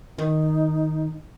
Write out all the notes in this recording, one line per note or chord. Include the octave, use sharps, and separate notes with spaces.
D#3 D#4